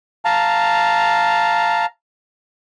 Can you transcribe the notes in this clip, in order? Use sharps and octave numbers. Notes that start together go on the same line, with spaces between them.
F5 A5 A#5